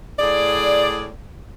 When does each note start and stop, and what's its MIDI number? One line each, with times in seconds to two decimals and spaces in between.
0.19 1.08 45
0.19 1.08 68
0.19 1.08 74